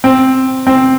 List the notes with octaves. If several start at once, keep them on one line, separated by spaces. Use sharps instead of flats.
C4
C4